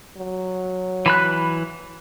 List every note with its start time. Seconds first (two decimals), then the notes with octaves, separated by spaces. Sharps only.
0.17 F#3
1.06 E3 B5 F#6